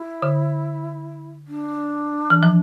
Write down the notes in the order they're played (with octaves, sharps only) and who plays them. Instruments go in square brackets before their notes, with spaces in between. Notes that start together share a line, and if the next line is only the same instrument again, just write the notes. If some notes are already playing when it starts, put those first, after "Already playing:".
Already playing: [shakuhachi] E4
[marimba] D3
[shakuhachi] D4
[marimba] E3
F3